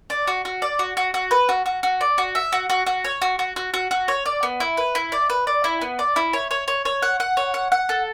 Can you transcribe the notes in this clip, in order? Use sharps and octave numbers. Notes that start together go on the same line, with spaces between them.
D5
F#4
F#4
D5
F#4
F#4
F#4
B4
F#4
F#4
F#4
D5
F#4
E5
F#4
F#4
F#4
C#5
F#4
F#4
F#4
F#4
F#4
C#5
D5
B3
E4
B4
E4
D5
B4
D5
E4
B3
D5
E4
C#5
C#5
C#5
C#5
F#5
F#5
C#5
F#5
F#5
A4